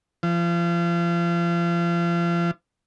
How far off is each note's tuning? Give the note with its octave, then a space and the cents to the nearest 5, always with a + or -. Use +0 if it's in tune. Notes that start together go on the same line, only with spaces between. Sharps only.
F3 -35